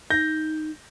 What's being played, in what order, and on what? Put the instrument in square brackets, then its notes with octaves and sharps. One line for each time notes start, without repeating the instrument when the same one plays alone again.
[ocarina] D#4 [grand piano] G6 A#6